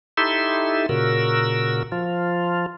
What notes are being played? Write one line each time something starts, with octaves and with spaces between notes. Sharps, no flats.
D#4 E4 G4 A4 E5 C6
A#2 C#3 F#4 A#4 E6
F3 F4